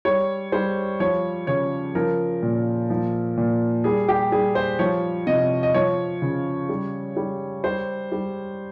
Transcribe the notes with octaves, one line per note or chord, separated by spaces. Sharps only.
G3 C#5
G3 C5
F3 C#5
C#3 C#5
F3 A#4
A#2
F3
A#2
G3 G#4
G4
G3 G#4
C5
F3 C#5
C3 D#5
D#5
F3 C#5
C#3
G3
G3
G3 C5
G3